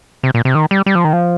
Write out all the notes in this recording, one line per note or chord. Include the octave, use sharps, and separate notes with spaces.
C3
A#2
C3
D#3
G3
G3
F3
D#3
F3